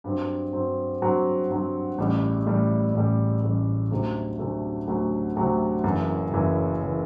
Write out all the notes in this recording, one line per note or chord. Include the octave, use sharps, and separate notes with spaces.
G2 F#3 C4
G2 F#3 C4
G2 F#3 C4
G2 F#3 C4
A1 A2 G3
A1 A2 G3
A1 A2 G3
A1 A2 G3
D2 C3 F#3 A3
D2 C3 F#3 A3
D2 C3 F#3 A3
D2 C3 F#3 A3
F#1 F#2 E3
F#1 F#2 E3
E3